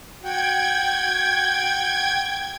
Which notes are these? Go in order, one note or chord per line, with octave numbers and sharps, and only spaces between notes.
F#4 G5 G#6